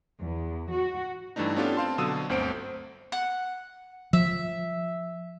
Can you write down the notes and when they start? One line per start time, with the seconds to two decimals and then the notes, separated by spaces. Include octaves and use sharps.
0.20 E2
0.71 F#4
1.36 G2 E3 A3 D4 D#4
1.56 B3 C#4 D4 F4 G4 A4
1.77 C4 C5 F5 A5 C6
1.98 B2 D3 F#3 D#6 E6 D#7
2.29 G1 D2 C4 C5 D7
3.12 F#5
4.13 F3 E5